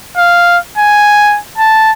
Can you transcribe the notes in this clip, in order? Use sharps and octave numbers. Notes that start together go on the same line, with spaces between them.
F5
G#5
A5